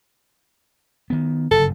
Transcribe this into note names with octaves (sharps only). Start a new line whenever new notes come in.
D#3 B3
F#1 G2 D3 A4